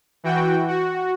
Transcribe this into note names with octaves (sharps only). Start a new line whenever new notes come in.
E3 F#4 G5
F#4